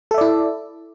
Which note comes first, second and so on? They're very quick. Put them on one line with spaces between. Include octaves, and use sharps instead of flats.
A4 E5 D5 E4